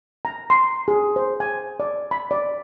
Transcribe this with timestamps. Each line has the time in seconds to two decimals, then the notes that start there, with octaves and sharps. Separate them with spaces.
0.25 A#5
0.50 C6
0.88 G#4
1.16 C5
1.40 G#5
1.80 D5
2.11 B5
2.31 D5